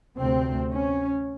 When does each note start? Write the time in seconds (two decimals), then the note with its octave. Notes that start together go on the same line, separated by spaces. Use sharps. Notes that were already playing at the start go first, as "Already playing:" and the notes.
0.19 D2 C3 C4
0.71 C#4